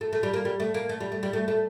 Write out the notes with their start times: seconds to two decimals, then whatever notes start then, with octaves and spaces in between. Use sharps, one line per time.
0.01 A3
0.13 A3
0.23 G3
0.34 A#3
0.45 G3
0.60 A3
0.74 A#3
0.89 A3
1.00 G3
1.12 A3
1.23 G3
1.33 A3
1.48 A3